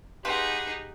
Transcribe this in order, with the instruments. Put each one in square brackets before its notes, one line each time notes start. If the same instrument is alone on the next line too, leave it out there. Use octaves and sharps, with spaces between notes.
[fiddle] D#4 G#4 [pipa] F4 B4 [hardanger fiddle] G4 F#5